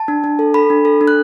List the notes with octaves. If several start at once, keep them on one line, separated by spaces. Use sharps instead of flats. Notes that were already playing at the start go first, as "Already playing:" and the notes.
Already playing: A5
D4
D4
A4
A4 B5
D4
A4
D4
F#6